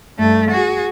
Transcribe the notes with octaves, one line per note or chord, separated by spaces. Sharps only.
G2 A3
F#4 G#4